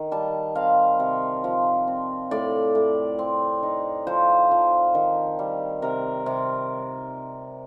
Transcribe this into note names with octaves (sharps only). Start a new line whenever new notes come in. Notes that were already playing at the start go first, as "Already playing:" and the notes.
Already playing: D#3
G3 A5
C4 F5
C3
F3
C4
A2 D5
A2
C4
D#4
F3 C5
F3
D#3
G3
C3 A#4
C3